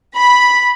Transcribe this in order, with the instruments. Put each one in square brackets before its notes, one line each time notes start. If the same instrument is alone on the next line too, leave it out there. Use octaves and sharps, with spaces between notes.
[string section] B5